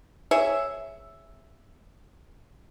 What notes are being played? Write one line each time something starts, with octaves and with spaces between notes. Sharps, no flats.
G#4 C#5 E5